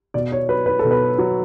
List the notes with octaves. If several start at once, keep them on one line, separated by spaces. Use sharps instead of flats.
B2 D5
C#5
F#3 B4
B4
A4
B2
B4
F#3